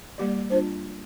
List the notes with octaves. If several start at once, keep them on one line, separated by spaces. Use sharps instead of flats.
G3 A#3 G4 D5
G3 D4 F4 C5